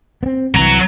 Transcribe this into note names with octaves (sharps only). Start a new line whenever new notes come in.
B3 C4
C2 E3 F#3 A#5